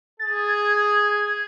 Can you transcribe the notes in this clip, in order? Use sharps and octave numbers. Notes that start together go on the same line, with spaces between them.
G#4 A6
G#6